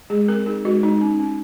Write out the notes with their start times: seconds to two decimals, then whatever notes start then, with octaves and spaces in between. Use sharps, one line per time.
0.10 G#3 G#4
0.28 C4 A#4
0.46 D#4 G#4
0.65 G#3 F#4
0.83 G#3 D#4
1.01 C#4
1.19 C#4